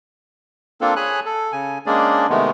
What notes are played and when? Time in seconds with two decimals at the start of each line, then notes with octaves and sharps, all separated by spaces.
0.81 A#3 C4 D4 F4 A4
0.96 G#4 C#5 G#5 B5 F#6
1.26 A4
1.52 C#3 G#5
1.86 G#3 A#3 C#4 D4 G#4 D5
2.30 C3 D#3 G#3 A3 B3